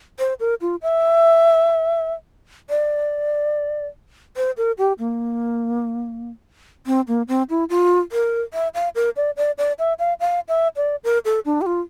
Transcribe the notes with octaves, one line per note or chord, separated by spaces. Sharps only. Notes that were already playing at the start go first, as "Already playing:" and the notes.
C5
A#4
F4
E5
D5
C5
A#4
G4
A#3
C4
A#3
C4
E4
F4
A#4
E5
F5
A#4
D5
D5
D5
E5
F5
F5
E5
D5
A#4
A4
D4
G4
F4